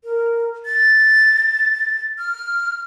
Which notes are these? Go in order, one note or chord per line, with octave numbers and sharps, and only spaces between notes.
A#4
A6
F6